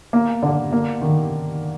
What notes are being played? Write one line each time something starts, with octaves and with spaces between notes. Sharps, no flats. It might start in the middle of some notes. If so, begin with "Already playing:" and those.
A#3
D3
A#3
D#3